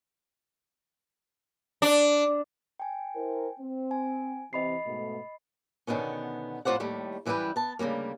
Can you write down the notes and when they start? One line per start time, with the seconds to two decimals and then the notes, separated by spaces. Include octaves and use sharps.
1.82 D4
2.80 G5 G#5
3.16 E4 A#4 C5
3.60 C4
3.91 G#5
4.53 C3 E3 D#5 B5 C7
4.86 G#2 B2 A3
5.87 B2 D3 D#3 F#3 B3 C#4
6.65 F2 A2 F4 C5 D5 F#5
6.80 D#2 A2 G3 A3
7.26 F#2 E3 G3 E4 B4 G5
7.56 B3 A5
7.79 D2 C#3 F#3 G3 A#3